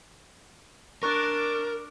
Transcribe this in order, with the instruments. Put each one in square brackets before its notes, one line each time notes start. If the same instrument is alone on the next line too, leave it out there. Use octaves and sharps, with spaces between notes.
[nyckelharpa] D4 D5 [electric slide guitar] A#4 [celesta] C#6 F#6